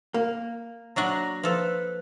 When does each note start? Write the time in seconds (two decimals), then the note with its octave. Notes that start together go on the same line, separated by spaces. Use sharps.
0.14 A#3
0.96 F#3 D4 F#4 A#5
1.43 F3 A4 B4